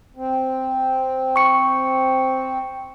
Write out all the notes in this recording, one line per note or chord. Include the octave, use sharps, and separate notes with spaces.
C4
C#6 C#7